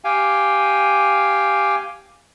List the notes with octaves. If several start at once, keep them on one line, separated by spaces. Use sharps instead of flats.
G4 F5 G5 G#5